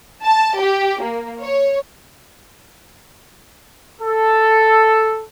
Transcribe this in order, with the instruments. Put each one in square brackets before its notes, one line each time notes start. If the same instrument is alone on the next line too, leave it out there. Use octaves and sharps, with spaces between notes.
[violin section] A5
G4
A#3
C#5
[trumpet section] A4